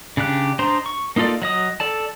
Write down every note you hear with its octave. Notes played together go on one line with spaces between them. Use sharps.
C#3 D4 G4 F#6
D4 D#4 C5 A#5 C6
C#6
A#3 D#4 F4 A4 D5
F#3 D#5 D#6
A4 D5 A5